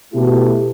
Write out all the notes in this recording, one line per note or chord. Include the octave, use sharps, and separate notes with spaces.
B2 A3 E4 G4